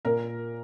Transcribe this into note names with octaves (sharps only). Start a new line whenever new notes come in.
A#2 A#4